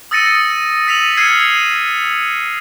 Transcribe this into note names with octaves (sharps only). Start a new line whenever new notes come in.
D#6 E6 A6 A#6 C#7 D#7
E6 B6 D#7 F7 F#7
E6 F6 G#6 C7 C#7 D#7